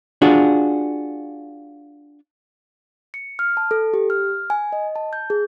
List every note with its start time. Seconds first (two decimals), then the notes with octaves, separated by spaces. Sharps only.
0.22 D4 F4 F#4 G#4
3.14 C#7
3.39 F6
3.57 A5
3.71 A4
3.94 G4
4.10 F6
4.50 G#5
4.72 D#5
4.96 A5
5.13 G6
5.30 G#4